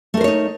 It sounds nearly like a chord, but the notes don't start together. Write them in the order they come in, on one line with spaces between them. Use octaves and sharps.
A3 A#4 C5 C#5 D#4